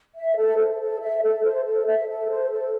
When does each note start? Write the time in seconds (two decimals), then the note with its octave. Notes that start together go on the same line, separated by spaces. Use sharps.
0.15 E5
0.37 A4
0.58 C5
0.80 A4
1.01 E5
1.23 A4
1.44 C5
1.65 A4
1.87 E5
2.08 A4
2.29 C5
2.50 A4